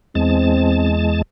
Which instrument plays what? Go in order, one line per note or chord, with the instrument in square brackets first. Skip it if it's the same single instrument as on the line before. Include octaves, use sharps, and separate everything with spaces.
[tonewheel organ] E2 G#3 A5 [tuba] C4